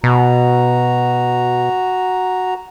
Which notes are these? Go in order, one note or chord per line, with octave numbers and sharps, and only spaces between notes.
B2 F#4 A#5